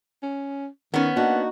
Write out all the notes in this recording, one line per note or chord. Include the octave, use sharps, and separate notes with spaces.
C#4
D#3 B3 C#4
A#3 D4 D#4 F#4